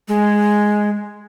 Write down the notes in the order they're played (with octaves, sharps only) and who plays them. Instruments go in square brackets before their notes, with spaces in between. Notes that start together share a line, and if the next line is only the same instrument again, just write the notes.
[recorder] G#3